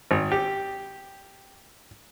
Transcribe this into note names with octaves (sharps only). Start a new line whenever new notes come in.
G#1
G4